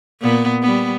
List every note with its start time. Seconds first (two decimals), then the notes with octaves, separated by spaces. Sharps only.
0.21 A#2 B3
0.62 G3 B3